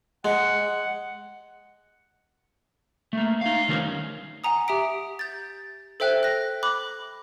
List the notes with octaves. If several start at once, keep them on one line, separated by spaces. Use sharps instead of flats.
G#3 F#5
A3 A#3
D#4 F5
D#3 G3 A3 C#4 D#4 A#4
F#5 G#5 A#5 D#6
G4 E5 D#6 B6 D7
G6 A6
A4 C5 E5 G5 F#6
F#6 A#6
B5 D6 F#6